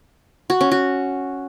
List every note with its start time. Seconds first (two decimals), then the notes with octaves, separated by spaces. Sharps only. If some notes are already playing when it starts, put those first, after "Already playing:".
0.50 F#4
0.61 C#4
0.71 F#4